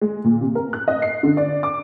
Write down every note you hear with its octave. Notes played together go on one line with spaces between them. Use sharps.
G#3
A#2
C3
A#4
F#6
D#5
C7
D3
D5
D6